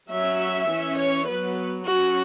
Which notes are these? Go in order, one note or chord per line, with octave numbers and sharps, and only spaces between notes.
F#3 C#4 E5
E3 C#4
C#5
F#3 B3 B4
F#3 C#4 F#4